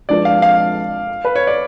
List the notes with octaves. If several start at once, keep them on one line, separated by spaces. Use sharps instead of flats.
F3 G#3 D4 F4 B4 D5
F5
F5
B4
C#5
D5